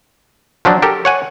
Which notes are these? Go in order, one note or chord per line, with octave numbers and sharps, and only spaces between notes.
F3 F#3 D4
G4 A4 A#4
C#5 F#5 G#5